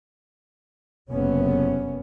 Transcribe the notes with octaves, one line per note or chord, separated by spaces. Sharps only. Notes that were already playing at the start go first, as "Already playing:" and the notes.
F#1 G2 C3 B3 C#4